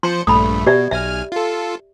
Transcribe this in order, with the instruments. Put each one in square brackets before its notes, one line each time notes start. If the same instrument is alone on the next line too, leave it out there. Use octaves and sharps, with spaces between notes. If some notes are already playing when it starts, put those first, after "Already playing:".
[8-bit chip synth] F3 C5 C#7 [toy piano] C6
[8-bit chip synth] A#1 G2 A3 [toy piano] B5 D#6
[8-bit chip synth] B2 [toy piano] G4 D5 E5
[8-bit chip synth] B1 G#5 F6 [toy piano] E5
[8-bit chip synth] F4 A4